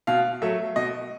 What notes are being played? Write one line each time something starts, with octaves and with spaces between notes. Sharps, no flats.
B2 F5
F#3 A3 E5
B2 D#5